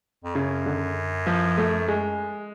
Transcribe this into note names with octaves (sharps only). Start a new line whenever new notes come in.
F2
F#2 C#3
D3
F3
A3
G#3